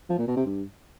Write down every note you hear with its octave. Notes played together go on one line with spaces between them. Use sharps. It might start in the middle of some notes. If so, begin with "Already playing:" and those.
F3
A#2
B2
C3
G2